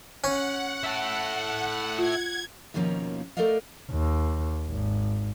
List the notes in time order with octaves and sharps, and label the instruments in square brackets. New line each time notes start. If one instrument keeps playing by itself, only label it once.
[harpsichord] C#4 [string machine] F#5
[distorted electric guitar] E4 A4
[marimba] F4 [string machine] G#6
[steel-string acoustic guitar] D#2 B2 D#3 F3 A#3 C#4
A3 A4 A#4 D5 D#5 F5
[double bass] D#2
G#1